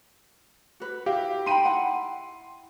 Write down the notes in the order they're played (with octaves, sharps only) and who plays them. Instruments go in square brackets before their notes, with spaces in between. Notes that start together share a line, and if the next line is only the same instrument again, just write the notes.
[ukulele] F#4 B4
[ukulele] E4 F#4 F5 [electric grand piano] G4
[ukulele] D#4 G5 B5 [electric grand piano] C6 D#7
[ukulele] E4 F#5